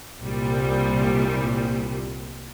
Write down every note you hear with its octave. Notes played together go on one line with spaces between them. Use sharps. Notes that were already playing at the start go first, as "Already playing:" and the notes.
C2 A#2 G3